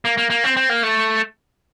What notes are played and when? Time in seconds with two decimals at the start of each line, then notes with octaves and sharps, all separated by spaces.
0.05 A#3
0.17 A#3
0.30 A#3
0.44 C4
0.57 C4
0.69 A#3
0.83 A3